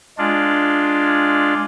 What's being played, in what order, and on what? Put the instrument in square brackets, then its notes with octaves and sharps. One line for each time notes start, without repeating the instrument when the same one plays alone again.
[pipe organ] G#3 D4 F4 D5